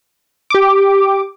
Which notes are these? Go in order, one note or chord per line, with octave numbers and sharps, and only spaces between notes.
G4 D6